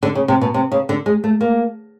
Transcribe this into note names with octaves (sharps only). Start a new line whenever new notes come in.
D3
C#3
C3
B2
C3
C#3
D3
G#3
A3
A#3